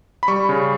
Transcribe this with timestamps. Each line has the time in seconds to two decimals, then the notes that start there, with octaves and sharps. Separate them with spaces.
0.23 B5
0.28 G3 C#6
0.49 C#3